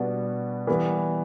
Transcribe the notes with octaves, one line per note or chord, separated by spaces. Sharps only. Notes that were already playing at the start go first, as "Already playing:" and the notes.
Already playing: B2 G3 B3 D4 F#4
E3 G3 B3